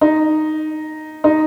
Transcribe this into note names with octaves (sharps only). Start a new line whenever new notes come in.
D#4
D#4